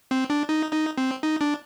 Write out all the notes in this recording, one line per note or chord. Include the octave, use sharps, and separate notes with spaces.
C4
D4
D#4
D#4
C4
D#4
D4